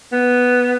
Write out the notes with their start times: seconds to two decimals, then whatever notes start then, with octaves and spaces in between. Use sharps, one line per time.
0.12 B3